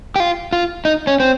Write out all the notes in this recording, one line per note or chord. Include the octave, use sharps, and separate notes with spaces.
G4
F4
F4
D#4
C#4
C4